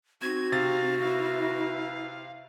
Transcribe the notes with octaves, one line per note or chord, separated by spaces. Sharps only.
C4 D#4 F#4 G#6
C3 F5 A6
E4 B4 F5